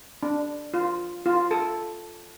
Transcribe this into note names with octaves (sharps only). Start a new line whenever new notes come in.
D4
F4
F4
A4